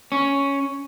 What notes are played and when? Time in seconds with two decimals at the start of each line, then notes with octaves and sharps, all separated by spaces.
0.12 C#4